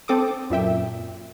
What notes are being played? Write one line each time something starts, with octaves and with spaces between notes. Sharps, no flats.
C4 A4 D6 D#6
F#2 A#2 E5 G5